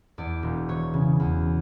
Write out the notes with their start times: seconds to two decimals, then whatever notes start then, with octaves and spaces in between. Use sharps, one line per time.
0.18 E2 D5
0.43 E1
0.69 E3 C#5
0.94 C#3
1.20 E2